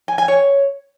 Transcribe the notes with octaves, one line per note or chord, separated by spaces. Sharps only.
G#5
G#5
C#5